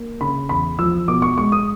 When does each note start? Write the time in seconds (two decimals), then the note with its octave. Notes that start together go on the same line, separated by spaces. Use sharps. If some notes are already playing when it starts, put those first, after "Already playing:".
Already playing: A#3
0.21 C#3 B5
0.49 E2 B5
0.79 F3 E6
1.08 B2 D6
1.22 C#6
1.37 G#3 C#6
1.52 D#6